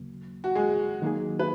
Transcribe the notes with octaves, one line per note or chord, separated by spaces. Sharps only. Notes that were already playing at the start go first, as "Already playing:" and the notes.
Already playing: D#2 C#3 F#3 A#3
F#4
G#3 G#4
D#3 F#3 A#3 D#4 G#4
B4